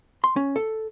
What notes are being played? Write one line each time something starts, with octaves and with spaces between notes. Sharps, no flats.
C6
C#4
A4